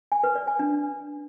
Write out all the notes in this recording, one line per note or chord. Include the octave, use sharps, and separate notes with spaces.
G#5
B4
D5
G#5
D4